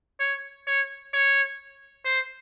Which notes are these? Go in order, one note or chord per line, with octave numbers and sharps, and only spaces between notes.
C#5
C#5
C#5
C5